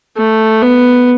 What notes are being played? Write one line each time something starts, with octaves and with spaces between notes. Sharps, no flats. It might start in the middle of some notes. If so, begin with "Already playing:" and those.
A3
B3